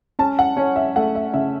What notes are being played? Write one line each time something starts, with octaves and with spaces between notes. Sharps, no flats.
C#4 A5
F#5
C#4 C#5
E5
A3 F#5
E5
C#3 E5